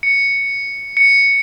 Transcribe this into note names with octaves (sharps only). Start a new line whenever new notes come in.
C#7
C#7